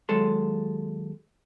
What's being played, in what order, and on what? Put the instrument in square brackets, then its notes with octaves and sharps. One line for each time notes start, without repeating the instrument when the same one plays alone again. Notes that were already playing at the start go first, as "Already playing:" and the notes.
[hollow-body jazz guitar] D#2 F#3 G#3 A4 C6